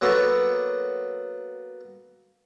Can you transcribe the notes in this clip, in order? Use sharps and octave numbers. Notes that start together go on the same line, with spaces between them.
F#3 A#3 B3 A4 C#6